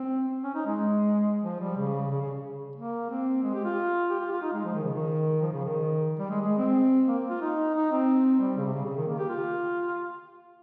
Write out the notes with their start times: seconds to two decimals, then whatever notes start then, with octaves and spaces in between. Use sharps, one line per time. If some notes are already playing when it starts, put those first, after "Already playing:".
Already playing: C4
0.44 C#4
0.55 D#4
0.66 G#3
1.43 F3
1.60 G3
1.77 C#3
2.10 C#3
2.21 C#3
2.76 A#3
3.10 C4
3.43 G#3
3.54 G4
3.65 F4
4.10 G4
4.20 F4
4.31 F4
4.42 D#4
4.53 G#3
4.65 F3
4.75 D#3
4.84 C#3
4.94 D#3
5.42 F3
5.53 C#3
5.64 D#3
6.19 G3
6.30 G#3
6.42 G#3
6.58 C4
7.08 A#3
7.30 F4
7.41 D#4
7.75 D#4
7.91 C4
8.40 G3
8.57 C#3
8.66 C3
8.74 C#3
8.84 C#3
8.96 D#3
9.07 A#3
9.18 G4
9.29 F4